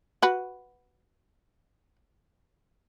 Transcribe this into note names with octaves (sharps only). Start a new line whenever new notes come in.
F#4 B4